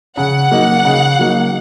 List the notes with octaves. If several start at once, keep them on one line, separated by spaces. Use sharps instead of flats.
C#3 F#5
F#3 A#3 D#4
C#3
F#3 A#3 D#4